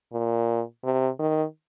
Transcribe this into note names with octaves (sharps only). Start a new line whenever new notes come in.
A#2
C3
D#3